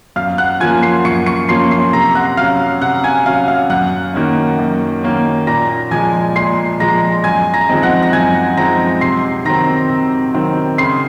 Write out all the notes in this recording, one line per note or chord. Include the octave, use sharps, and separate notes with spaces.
F#2 F5 F6
F#5 F#6
F3 A#3 C#4 F4 G#5 G#6
C6 C7
F#2 C#6 C#7
C#6 C#7
F3 A#3 C#4 F4 C6 C7
C6 C7
C3 A#5 A#6
F#5 F#6
F#3 C#4 F5 F6
C3 F#5 F#6
G#5 G#6
F#3 C#4 F5 F6
F5 F6
F#2 F#5 F#6
D#3 F#3 A#3 C#4
F#2
D#3 F#3 A#3 C#4
A#2 A#5 A#6
F3 G#3 G#5 G#6
A#2 C6 C7
F3 G#3 A#5 A#6
F#2 G#5 G#6
A#5 A#6
F3 G#3 C4 D#4
F#5 F#6
A#6
F#2 G#5 G#6
F3 G#3 C4 D#4 A#5 A#6
C3 C6 C7
D#3 F#3 C4 A#5 A#6
C3
D#3 F#3 C4
C#3 C6 C7